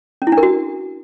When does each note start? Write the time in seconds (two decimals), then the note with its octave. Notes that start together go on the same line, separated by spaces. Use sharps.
0.22 C#4
0.27 E4
0.32 D4
0.38 A#4
0.43 F#4